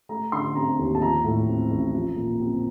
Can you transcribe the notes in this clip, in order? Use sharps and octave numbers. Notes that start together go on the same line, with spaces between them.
A3 A#5
D3 C6
C4 A#5
D#2
A5
F3 A#5
A2
C4
A1
F3
A#2
C4